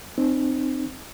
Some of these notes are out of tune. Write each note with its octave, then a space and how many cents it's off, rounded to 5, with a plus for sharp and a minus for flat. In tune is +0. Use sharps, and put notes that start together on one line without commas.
C4 +0 D#4 -35